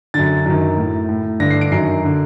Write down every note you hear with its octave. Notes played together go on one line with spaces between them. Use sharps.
F#2 D3 A6
F#2 D#3
A2
A2
G2 D3 A#6
C7
D7
F#2 D#3 C7
D3